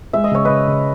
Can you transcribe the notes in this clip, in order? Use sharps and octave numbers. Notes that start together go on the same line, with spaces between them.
G#3 E5
D#5
C#3 C#5
C#3 B4 D#5
C#3